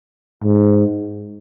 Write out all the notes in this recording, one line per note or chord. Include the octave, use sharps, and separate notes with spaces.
G#2